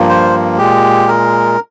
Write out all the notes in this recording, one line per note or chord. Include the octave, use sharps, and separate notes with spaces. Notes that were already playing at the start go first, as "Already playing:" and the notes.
Already playing: G2 F3 A#3
C5
A#2 G#3 G4
A#4